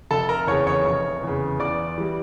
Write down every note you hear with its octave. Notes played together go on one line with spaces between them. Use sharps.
F1 A4 A5
A#4 A#5
E2 C#3 C#5 C#6
C#5 C#6
F1
E2 C#3
E2 D5 D6
E3 G3